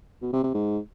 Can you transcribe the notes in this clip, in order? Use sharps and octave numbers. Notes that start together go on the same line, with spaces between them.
B2
C3
C3
G#2